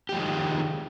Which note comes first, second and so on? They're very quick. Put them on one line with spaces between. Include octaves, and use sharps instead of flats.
G4 F3 G#3 D#3